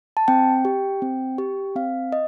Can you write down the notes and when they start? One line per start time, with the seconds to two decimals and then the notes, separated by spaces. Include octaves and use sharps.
0.17 A5
0.28 C4 G5
0.65 G4
1.02 C4
1.38 G4
1.76 C4 F5
2.12 D#5